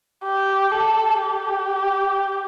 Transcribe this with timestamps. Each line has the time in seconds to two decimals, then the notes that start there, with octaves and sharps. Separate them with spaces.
0.24 G4
0.72 A4
1.20 G4